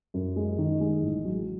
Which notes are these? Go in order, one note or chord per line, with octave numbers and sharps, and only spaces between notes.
F#2
G#3
D#3
G#3
A1
F#3